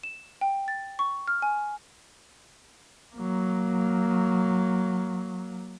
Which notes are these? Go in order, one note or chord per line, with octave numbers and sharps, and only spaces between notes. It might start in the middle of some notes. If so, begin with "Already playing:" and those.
E7
G5
A6
C#6
F6
G#5
F#3 A#3